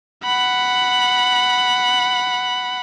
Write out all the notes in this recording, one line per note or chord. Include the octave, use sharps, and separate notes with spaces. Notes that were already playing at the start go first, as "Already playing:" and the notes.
F#5 B5